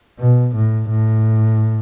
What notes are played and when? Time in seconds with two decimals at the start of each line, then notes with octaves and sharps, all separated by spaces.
0.19 B2
0.55 A2
0.90 A2